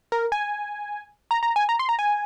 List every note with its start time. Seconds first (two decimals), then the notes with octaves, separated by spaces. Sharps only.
0.12 A#4
0.32 G#5
1.31 A#5
1.43 A#5
1.56 G#5
1.69 A#5
1.79 C6
1.89 A#5
1.99 G#5